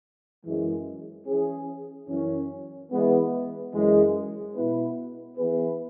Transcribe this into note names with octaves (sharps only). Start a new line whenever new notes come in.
F#2 E3 G#3
E3 C#4 G#4
F#2 E3 C#4
E3 G#3 B3
F#2 E3 G#3
B2 B3 E4 B4
E3 B3 G#4 B4